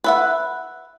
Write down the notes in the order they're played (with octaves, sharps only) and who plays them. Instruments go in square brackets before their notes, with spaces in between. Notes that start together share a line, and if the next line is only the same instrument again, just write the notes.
[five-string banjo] B4 E5 F#5